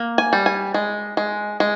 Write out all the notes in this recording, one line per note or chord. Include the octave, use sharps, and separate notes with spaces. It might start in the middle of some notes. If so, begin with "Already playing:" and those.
Already playing: A#3
G#5
G3
G#5
G#3
G#3
G#3